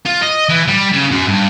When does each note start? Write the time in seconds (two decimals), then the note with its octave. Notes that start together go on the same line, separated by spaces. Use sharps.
0.06 F4
0.22 D#5
0.49 E3
0.68 G3
0.92 C#3
1.11 F#2
1.28 G2